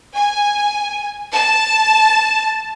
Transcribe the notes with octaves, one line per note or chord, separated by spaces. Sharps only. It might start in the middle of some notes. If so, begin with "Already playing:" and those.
G#5
A5